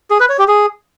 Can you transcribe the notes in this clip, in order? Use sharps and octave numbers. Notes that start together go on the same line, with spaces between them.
G#4
B4
C#5
G4
G#4